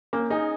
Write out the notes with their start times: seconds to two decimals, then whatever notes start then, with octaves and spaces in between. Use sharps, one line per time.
0.13 A#3 C#4
0.30 D#4 G#4 D#5 G#5